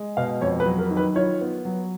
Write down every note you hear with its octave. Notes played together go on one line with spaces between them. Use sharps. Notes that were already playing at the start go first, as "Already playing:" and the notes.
Already playing: G#3
B2 F5
F2 C#5
B4
F#3
A#4
D#3
B4
F4 C#5
B3
F#3